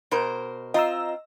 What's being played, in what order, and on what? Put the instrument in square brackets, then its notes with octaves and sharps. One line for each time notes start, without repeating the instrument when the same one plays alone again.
[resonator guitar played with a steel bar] B2 A#4 C5
[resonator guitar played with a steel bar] C4 F4 [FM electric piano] D#5 A#5 E6